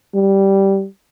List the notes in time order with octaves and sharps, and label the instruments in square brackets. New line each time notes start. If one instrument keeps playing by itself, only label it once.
[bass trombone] G3